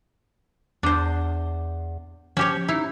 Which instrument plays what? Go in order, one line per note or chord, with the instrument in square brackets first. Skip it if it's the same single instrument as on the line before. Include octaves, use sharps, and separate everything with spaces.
[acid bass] E2 [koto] D4 C5
[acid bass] F3 [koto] C#4 G4 C#5
[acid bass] D#4 [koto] E4